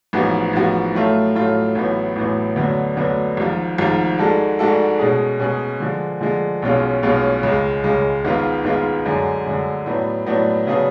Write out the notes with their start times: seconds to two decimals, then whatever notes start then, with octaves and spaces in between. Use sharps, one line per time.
0.13 A1 G#2 F3 B3 F#4
0.53 A1 G#2 F3 B3 F#4
0.94 A2 F#3 A3 F4
1.35 A2 F#3 A3 F4
1.75 A1 A2 F#3 B3
2.16 A1 A2 F#3 B3
2.56 D2 D3 F#3 B3
2.97 D2 D3 F#3 B3
3.37 G#1 G#2 F3
3.78 G#1 G#2 F3
4.19 G#2 G#3 D4 F#4 A4
4.59 G#2 G#3 D4 F#4 A4
4.99 B2 G#3 C#4 G#4
5.40 B2 G#3 C#4 G#4
5.80 D3 F3 G#3
6.21 D3 F3 G#3
6.62 B1 B2 G#3 C#4 F4
7.03 B1 B2 G#3 C#4 F4
7.43 C#2 C#3 G#3
7.84 C#2 C#3 G#3
8.25 G#1 G#2 G#3 B3 F4
8.64 G#1 G#2 G#3 B3 F4
9.06 F#2 D3 G#3
9.46 F#2 D3 G#3
9.86 A2 F#3 B3 D4
10.26 A2 F#3 B3 D4
10.67 C#3 F#3 B3 D4 G#4